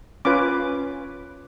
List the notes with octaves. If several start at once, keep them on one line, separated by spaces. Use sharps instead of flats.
C#4 F4 B4 D6